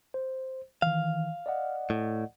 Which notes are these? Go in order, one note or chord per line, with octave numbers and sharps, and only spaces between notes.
C5
D#3 E3 F5
D5 D#5 F#5
A2